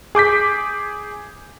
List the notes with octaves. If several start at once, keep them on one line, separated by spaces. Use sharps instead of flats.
G#4 D6 G6 B6